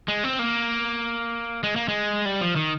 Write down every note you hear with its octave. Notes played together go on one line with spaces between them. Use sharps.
G#3
C4
A#3
G#3
A#3
G#3
G3
F3
D#3